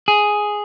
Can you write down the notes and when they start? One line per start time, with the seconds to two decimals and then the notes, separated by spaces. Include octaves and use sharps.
0.08 G#4